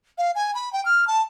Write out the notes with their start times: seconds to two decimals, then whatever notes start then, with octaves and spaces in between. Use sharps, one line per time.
0.18 F5
0.35 G#5
0.55 B5
0.73 G5
0.85 F6
1.07 A5